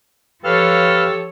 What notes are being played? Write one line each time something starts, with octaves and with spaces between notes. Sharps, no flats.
F3 G4 A4 B4 C#5 F5 F6